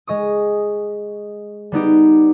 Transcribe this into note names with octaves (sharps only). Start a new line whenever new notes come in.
G#3 D#5 C#6 D#6
G3 B3 D#4 G4